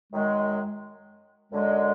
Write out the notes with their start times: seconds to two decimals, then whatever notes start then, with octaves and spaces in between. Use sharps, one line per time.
0.13 F#2 D#3 G#3
1.52 F#2 D3 G#3